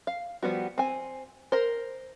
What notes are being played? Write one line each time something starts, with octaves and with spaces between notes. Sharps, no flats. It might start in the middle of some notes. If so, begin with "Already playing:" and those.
F5
F3 G3 B3 F#4
C4 G#5
A#4 C5